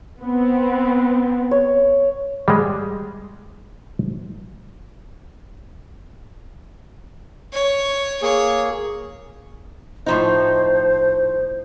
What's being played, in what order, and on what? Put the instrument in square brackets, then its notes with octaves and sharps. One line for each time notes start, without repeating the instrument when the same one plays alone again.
[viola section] B3 C4
[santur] C#5
[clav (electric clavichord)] G3 G#3
[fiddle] C#5
[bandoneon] A#3 G#4 [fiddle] C#5
[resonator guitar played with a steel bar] A2 F3 D#4 [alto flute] C5